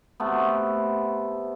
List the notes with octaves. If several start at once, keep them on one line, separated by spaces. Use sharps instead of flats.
C3 A3 B3